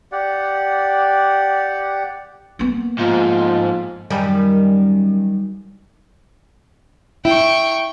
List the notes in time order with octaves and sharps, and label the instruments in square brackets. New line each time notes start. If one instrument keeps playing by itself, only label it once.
[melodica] G4 D5 F#5
[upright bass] A#3 B3
[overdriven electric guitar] G#2 [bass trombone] F3 [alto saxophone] F4
[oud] F#2 D#3 G3
[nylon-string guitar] E4 [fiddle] G5 C#6